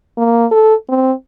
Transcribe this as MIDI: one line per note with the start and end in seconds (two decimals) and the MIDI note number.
0.18 0.46 58
0.51 0.74 69
0.89 1.13 60